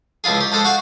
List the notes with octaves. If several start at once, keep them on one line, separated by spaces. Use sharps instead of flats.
C#2 F3 E4 F4 G#4
G4
F3 G#3 A4 C5
F#4 F5